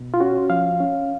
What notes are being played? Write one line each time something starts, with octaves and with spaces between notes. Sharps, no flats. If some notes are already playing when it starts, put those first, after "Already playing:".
Already playing: B2
F4
C#4 F#4
F3 F5
C#4